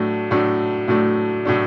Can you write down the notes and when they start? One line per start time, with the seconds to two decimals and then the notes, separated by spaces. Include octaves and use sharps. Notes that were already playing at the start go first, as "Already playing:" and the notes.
Already playing: A2 F#3 A3 D4
0.31 A2 F#3 A3 D4
0.88 A2 F#3 A3 D4
1.45 A2 F#3 A3 D4